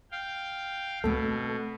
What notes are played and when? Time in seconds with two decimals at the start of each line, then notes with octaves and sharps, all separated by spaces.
0.11 F5 G5
1.04 B2 A3 C4 A4